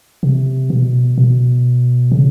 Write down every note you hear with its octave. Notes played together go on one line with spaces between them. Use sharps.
C3
B2
B2
C#3